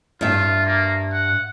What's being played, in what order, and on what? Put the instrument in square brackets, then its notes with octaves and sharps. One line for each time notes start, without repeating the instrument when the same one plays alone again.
[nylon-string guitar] G2 E5 [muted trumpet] F4
[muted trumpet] A#3
F#5